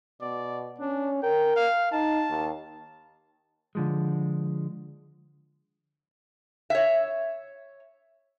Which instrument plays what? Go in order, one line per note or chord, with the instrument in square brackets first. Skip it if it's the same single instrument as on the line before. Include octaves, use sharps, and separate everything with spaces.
[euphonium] B2 [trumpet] D5
[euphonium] C#4 [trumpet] D4
[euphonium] A#4 [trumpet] G5
[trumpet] F5
[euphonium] D#4 [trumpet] A5
[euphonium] D#2
[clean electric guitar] D3 F3 G#3
[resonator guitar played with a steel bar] C#5 E5